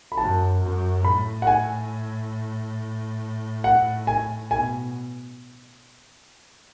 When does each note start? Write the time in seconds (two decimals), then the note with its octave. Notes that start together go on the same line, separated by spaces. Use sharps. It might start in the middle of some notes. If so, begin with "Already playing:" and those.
0.12 B5
0.17 F#2 A5
0.60 F#2
1.03 A2 B5
1.42 F#5
1.47 G#5
3.64 F#5
4.07 G#5
4.51 B2 G#5